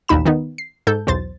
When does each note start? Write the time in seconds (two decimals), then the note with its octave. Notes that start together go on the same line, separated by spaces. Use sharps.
0.08 A1 D#2 A#2 D#4 B5 E7
0.26 D#3 B3 D#4
0.58 C7
0.87 G#2 A4 G6
1.07 B1 E2 C5 A6